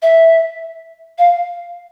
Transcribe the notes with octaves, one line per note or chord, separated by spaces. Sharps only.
E5
F5